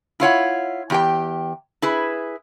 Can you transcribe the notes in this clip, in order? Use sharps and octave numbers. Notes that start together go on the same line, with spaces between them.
E4 F4 C#5 F#5
E2 G4 G5
E4 G#4 B4